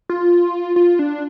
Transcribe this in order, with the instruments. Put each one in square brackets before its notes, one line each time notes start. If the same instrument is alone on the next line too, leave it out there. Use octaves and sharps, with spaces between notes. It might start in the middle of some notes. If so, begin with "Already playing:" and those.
[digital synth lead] F4
F4
D4